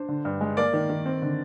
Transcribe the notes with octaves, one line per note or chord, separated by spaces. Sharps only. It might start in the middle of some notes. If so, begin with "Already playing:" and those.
Already playing: D4 C5
D3
G2
G#3
A#3 D5
D#3
D#3
C4
D3